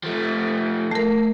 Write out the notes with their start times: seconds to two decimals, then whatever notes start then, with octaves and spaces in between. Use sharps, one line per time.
0.04 F3 A3
0.91 A3 A#4